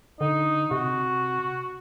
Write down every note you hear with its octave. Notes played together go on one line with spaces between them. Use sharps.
D3 D#4
C3 F#4